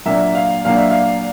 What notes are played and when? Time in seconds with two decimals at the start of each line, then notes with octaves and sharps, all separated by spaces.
0.06 A#2 F#3 A#3 D4 E5
0.35 F5
0.65 A#2 F#3 A#3 D4 F5
0.78 E5
0.91 F5